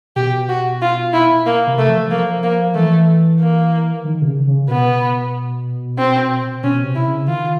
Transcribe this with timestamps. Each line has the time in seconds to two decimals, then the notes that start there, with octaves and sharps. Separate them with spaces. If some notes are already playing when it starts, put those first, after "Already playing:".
0.16 B2 G4
0.49 F#4
0.82 F4
1.13 E4
1.46 A#3
1.67 C3
1.78 A3
1.89 F3
2.10 F3 A#3
2.43 A#3
2.75 E3 A3
3.39 A#3
4.05 D#3
4.22 C3
4.26 C#3
4.47 C#3
4.68 B2 B3
5.98 C4
6.63 B2 C#4
6.84 C3
6.95 C3 E4
7.06 C#3
7.27 D#3 F4